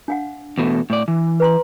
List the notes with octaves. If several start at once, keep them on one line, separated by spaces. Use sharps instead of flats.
D4 F5 F#5
E2 B2 A3
A2 D5
E3
B4 A#5 C6